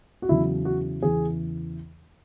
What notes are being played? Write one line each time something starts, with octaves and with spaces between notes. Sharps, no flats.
F#4
E2 C#3 F#3 E4
F#4
E2 C#3 E3 G#4